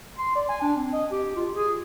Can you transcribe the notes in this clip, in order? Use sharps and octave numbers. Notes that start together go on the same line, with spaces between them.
C6
D5
G#5
D4
C4
D#5
G4
F4
G#4